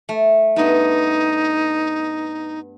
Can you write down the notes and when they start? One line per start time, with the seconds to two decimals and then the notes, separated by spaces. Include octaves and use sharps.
0.09 A3
0.56 G2 B3 D#4